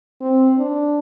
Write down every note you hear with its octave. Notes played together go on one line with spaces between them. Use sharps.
C4
D4